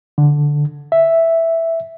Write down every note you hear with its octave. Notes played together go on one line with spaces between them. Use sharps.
D3
E5